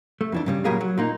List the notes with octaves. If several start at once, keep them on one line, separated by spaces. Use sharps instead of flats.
A3
F2 E3 D4
G2 C#3 G3
A#2 F#3 G3 G#4 A#4 F5
F#3
A#2 A#3 D#4